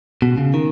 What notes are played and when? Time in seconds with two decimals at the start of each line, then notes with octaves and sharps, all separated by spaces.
0.22 B2
0.37 C#3
0.54 D#3